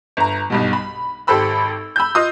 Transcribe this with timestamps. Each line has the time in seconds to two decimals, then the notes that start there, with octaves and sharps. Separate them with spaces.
0.17 G1 A#5
0.50 B1 G2 B2
0.73 B5
1.27 G#1 G4 A4 C5 B5 E6
1.96 B5 E6 G6
2.15 F4 D#5 D#6